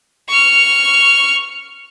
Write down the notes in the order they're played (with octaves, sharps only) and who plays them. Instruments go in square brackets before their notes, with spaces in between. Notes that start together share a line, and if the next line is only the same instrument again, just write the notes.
[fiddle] C#6 F6